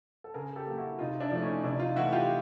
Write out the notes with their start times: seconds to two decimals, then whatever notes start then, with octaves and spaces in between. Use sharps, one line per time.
0.24 A4
0.34 C#3 G#4 A#4
0.56 G4 A4
0.66 F#3 A#3
0.77 E4 F#4
0.99 C3 D#4 F4
1.20 D4 E4
1.31 F3 A3
1.42 C#4 D#4
1.63 C3 D4 E4
1.80 D#4 F4
1.96 E3 E4 F#4
1.99 A3
2.12 F4 G4